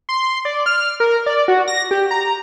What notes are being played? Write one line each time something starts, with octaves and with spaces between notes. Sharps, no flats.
C6
D5
F6
A#4
D5
F#4
A#6
G4
A#5